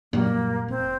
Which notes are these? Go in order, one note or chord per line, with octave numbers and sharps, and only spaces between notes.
F#2 A#2 F#3 G3 A#3
F1 C4